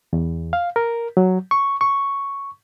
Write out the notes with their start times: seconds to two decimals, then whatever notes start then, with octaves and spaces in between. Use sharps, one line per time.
0.13 E2
0.53 F5
0.76 A#4
1.17 F#3
1.51 C#6
1.81 C#6